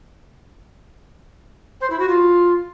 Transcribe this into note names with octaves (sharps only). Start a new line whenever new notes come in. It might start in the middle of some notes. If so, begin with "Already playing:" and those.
C5
E4
F#4
F4